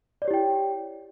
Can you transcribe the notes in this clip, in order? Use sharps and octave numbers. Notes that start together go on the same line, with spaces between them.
E4 G4 C#5 D5 G5